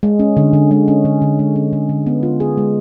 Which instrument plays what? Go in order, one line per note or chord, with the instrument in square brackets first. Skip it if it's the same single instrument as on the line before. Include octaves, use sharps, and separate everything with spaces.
[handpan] G#3
C#4
D3
D3
G#3
C#4
D3
D3
G#3
C#4
D3
D3
B3
F4
G#4
G#3